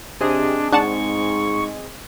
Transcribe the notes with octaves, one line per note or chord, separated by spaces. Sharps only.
C3 C4 D4 G#4 D#5
G#2 D4 F#5 A5 C#6